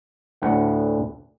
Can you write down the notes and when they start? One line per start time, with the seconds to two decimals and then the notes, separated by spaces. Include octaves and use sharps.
0.42 D2 A2 F#5